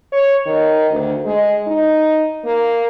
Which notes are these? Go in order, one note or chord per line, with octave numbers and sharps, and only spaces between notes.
C#5
D#3
D2
G#3
D#4
A#3